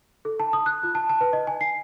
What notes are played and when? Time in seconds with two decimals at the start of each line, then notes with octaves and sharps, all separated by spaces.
0.25 A4
0.40 A5
0.53 D#6
0.66 F#6
0.83 F4
0.95 A5
1.09 A5
1.21 B4
1.33 D#5
1.47 G#5
1.61 C7